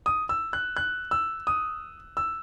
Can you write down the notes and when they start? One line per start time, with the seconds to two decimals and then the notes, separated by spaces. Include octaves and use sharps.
0.06 D#6
0.29 E6
0.53 F#6
0.77 F#6
1.11 E6
1.47 D#6
2.17 E6